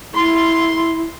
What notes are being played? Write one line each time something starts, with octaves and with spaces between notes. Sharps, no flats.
E4 C6